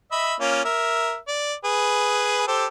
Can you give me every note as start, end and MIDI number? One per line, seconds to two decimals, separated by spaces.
0.12 0.34 75
0.12 0.34 76
0.12 0.34 83
0.40 0.61 58
0.40 0.61 61
0.40 0.61 65
0.65 1.16 70
0.65 1.16 76
1.28 1.54 74
1.64 2.46 68
1.64 2.46 71
2.48 2.66 67
2.48 2.66 69
2.48 2.66 72